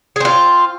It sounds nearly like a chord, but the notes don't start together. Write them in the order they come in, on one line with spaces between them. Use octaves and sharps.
G#4 C4 F4